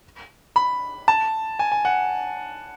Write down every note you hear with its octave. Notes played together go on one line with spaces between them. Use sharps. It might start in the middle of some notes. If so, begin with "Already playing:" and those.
B5
A5
G#5
G#5
F#5